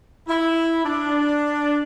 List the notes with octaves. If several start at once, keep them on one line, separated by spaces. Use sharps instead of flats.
E4
D4